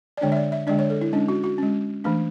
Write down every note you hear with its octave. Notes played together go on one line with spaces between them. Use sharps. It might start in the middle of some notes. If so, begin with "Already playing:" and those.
D5
D3 G#3 D4 C#5
E5
D5
E5
D3 G#3 D4 D5
C#5
A4
E4
G#3 C#4 D4
F#4
F#4
G#3 C#4
E3 A3 D4